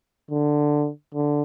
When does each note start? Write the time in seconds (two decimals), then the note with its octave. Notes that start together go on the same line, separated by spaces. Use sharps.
0.31 D3
1.15 D3